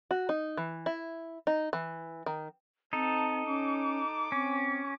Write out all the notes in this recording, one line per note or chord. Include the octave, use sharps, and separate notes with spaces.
F#4
D#4
E3
E4
D#4
E3
D#3
C4 D#4 A4 A5
C#4 D6
C4 C#4